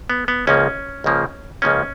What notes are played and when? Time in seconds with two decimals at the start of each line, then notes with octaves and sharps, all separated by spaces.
0.10 B3
0.28 B3
0.47 C#2 C#3 F3 A#3 C#4
1.04 C#2 C#3 F3 A#3
1.62 C#2 C#3 F3 A#3 C#4